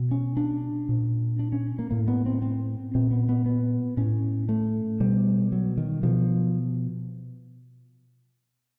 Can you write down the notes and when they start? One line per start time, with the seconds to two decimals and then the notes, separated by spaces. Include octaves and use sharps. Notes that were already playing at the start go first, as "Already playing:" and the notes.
Already playing: B2
0.11 C#4
0.37 D4
0.89 A#2
1.39 D4
1.52 C#4
1.79 A#3
1.91 A2 A#3
2.08 B3
2.26 C4
2.42 C4
2.95 A#2 C4
3.11 B3
3.29 B3
3.46 B3
3.97 A2 C#4
4.49 A3
5.00 B2 G3
5.52 F#3
5.77 D#3
6.03 B2 F3